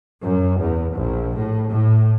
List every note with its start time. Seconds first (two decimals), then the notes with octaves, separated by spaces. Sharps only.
0.22 F#2
0.60 E2
0.95 A#1
1.36 A2
1.70 A2